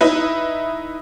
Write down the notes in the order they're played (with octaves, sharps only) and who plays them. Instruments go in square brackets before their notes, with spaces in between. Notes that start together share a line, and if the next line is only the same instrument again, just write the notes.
[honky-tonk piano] D#4 E4 B4